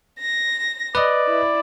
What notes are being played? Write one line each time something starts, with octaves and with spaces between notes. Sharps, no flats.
A#6
B4 D5 D#5
E4